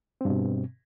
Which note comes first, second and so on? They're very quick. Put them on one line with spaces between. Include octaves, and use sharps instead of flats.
C4 G2 B2